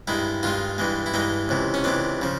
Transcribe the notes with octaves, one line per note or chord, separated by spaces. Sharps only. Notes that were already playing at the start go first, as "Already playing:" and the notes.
G2 D#3 G#3 E4
G2 D#3 G#3 F4
G2 E3 G#3
E4
G2 E3 G#3 D#4
C#2 C3 E3
C#4
C#2 C3 E3 D4
C#3 F3